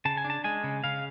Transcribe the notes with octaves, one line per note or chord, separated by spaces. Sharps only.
C#3 A5
G#5
D4
A5
G#3 G#5
C#3
C#3 F5